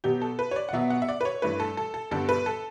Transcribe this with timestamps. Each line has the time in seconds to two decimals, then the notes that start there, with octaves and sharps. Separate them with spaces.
0.04 B2 F#3 B3 G4
0.22 A4
0.39 B4
0.51 C#5
0.56 D5
0.69 F#5
0.73 B2 F#3 B3 E5
0.90 F#5
1.02 E5
1.09 D5
1.21 B4
1.25 C#5
1.42 G2 E3 A3 B4
1.60 A4
1.77 A4
1.94 A4
2.11 G2 D3 G3 B3 A4
2.29 B4
2.46 A4